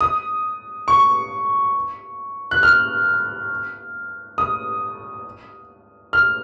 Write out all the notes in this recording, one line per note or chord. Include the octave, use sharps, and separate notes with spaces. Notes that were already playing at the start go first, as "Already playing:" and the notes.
D#6
C#6
F#6
F6
D#6
F6